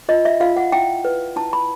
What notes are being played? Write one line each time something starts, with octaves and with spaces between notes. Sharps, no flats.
F4 D#5
E5
F4 F5
F#5
E4 G5
B4
E4 A5
B5